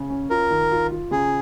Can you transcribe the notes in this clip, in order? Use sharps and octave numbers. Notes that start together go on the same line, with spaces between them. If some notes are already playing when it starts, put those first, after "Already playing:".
Already playing: C#3
C#4
F4 A#4
D#3
F4
F4
C#3 G#4